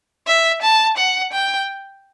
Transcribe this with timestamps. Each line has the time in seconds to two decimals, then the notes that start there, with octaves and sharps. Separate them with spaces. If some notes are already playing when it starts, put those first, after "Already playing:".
0.27 E5
0.62 A5
0.97 F#5
1.33 G5